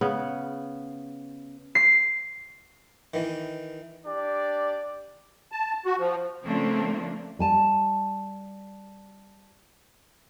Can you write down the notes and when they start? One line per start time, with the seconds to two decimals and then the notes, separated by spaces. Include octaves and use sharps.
0.01 C#3 B3
1.75 C7
3.14 D#3 E3
4.06 D4 G4 D5
5.52 A5
5.85 F#4
5.99 F3
6.44 C#3 F3 A3 A#3 C4 D4
7.39 G3 G#5 A5